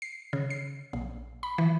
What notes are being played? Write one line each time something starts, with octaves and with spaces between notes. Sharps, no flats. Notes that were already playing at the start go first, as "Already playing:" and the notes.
C7
C#3
C7
A#1
B5
E3